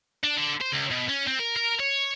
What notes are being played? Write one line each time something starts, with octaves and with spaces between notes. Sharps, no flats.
D4
D3
C5
C#2
B2
C#4
C4
A#4
A#4
C#5